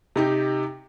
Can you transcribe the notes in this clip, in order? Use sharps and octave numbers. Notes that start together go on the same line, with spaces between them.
C3 D#4 G4